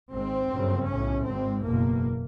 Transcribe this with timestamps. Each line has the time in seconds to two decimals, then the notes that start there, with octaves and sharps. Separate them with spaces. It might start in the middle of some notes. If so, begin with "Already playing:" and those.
0.13 G#1 G#2 C4
0.51 G1 F#2 C#3
0.89 B1 A2 C#4
1.27 G#1 G#2 C4
1.65 F#1 E2 B2 A#3